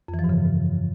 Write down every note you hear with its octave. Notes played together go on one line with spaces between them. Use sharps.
F2
E3
F3
G2
C#3